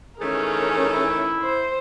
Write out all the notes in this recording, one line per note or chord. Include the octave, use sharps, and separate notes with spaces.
D#3 E3 A3 C#4 G#4 A#4
E4
C5